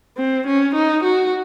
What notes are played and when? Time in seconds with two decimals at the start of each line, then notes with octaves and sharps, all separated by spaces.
0.17 C4
0.47 C#4
0.75 D#4
1.04 F#4